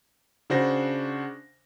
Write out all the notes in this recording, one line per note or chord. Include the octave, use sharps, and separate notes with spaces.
C#3 D4 F#4 C5 A#6